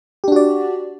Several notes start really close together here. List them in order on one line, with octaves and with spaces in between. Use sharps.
G4 D4 F#4 D5